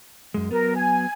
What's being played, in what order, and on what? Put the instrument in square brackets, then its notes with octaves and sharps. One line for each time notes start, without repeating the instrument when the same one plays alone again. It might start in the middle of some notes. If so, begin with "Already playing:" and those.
[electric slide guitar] F#2 G#3
[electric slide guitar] F#3 B3 [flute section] A#4
[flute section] G#5